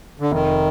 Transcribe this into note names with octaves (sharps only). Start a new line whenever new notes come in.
D3
F1 D#3